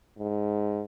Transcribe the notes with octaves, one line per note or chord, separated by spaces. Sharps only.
G#2